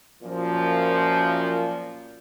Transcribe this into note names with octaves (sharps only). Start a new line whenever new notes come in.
F#2 A#2 F3